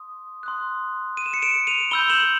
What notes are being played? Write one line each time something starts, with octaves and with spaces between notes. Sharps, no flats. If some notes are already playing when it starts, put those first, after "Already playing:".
Already playing: C6 D#6
C6 D#6 F#6
D#7
E7
C#7 D#7
D7 E7
D#7 F7
B5 E6 G6 F7 G7
E7 F#7